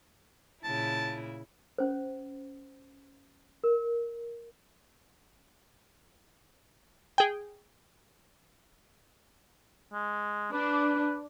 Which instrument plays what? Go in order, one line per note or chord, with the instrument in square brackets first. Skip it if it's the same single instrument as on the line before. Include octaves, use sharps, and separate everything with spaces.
[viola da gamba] A#2 C#3 E4 [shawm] A5
[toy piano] C#4 C5
A#4
[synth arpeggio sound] G#4 G5
[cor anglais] G#3
[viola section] D4 [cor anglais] B4